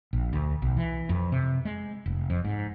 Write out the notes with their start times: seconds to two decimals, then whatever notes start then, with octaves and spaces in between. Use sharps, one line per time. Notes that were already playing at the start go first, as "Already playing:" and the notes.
0.13 A#1
0.33 D2
0.62 B1
0.77 E3
1.09 F2
1.32 C3
1.65 G#3
2.06 F1
2.30 F2
2.45 G#2